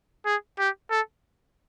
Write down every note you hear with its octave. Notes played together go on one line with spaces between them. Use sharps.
G#4
G4
A4